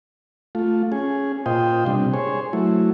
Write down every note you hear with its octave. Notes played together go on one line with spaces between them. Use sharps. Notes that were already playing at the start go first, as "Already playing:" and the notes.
A3 F4
C#4 G#4
A#2 F4 C5 D#5 G5
C3 G3 D4
G#4 C5 C#5
F#3 A3 E4